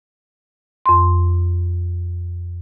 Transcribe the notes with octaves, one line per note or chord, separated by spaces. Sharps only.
F2 C6